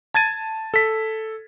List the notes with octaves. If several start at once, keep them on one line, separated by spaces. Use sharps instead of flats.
A5 G#6 A6 D#7
A4 B6